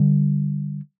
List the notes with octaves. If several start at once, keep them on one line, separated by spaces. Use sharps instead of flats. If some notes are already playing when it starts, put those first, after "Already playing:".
Already playing: D3 G3